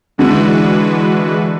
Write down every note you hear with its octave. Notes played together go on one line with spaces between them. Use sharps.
D3 E3 G#3 D4 F#4 B4